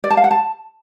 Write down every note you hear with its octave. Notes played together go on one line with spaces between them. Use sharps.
D5
A5
F5
F#5
A5